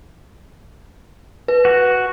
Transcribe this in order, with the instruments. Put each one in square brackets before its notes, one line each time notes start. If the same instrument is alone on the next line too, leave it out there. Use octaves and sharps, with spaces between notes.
[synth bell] B4
[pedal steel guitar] F#4